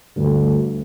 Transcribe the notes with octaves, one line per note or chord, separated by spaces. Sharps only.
D2 G2